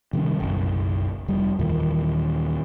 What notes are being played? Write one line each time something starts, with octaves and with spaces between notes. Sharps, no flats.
C3 D#3 G3 C#4
F#1 B1
F1 G3
D#2 A#2 D#3 E3